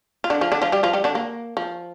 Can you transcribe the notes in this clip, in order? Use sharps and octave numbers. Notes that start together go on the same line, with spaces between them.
F4
D3 D4
F3 F4
D3 D4
F3 F4
G3 G4
F3 F4
G3 G4
D3 D4
A#3
F3